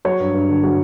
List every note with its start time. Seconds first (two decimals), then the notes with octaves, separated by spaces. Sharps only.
0.05 F#3 C#5
0.20 G2
0.34 G2
0.49 D3
0.64 F#3